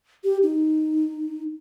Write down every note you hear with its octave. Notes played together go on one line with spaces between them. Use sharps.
G4
D#4